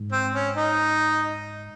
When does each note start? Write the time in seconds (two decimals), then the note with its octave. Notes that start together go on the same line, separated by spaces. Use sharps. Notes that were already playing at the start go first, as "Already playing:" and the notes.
Already playing: G#2
0.12 C4
0.34 C#4
0.56 D#4